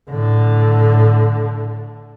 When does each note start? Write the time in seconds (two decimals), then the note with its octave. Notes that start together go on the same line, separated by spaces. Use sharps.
0.10 A2 D3